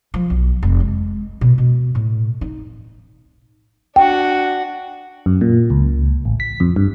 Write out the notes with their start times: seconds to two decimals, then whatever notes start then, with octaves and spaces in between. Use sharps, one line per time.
0.14 F3
0.30 B1
0.63 F1
0.80 G#3
1.41 B2
1.58 B2
1.95 A2
2.41 D#4
3.96 D4 F#4 G5
5.26 F#2
5.41 A#2
5.70 C#2
6.25 A1
6.40 B6
6.60 F2
6.76 G2